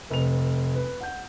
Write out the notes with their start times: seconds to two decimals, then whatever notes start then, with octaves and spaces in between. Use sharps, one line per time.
0.11 F1 B4 F7
0.75 B4
1.01 F#5 G6